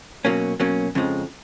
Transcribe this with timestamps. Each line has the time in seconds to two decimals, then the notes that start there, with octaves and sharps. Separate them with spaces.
0.25 B2 F#3 A#3 C#4
0.60 B2 F#3 A#3 C#4
0.95 F2 C#3 F3 G#3